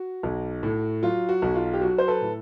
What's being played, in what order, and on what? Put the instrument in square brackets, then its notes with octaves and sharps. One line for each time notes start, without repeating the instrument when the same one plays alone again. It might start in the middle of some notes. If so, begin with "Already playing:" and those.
Already playing: [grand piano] F#4
B1
A2
F#3 F4
F#4
B1
F4
G4
F#3 F#4
C5
A4 B4
A2